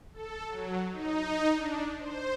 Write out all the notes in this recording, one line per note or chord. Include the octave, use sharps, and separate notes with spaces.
A4
F#3
D#4
D4
C5